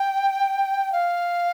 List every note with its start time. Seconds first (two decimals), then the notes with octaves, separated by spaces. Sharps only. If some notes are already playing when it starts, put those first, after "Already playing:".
Already playing: G5
0.92 F5